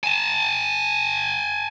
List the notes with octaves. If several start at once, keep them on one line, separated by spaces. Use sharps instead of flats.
G#5 A5